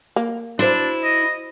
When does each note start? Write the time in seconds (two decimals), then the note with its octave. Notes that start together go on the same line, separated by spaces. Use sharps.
0.16 A#3
0.59 D4 E4 F#4 C5
1.04 D#5